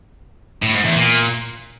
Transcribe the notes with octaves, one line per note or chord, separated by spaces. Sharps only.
A2
G#2
E2
A#2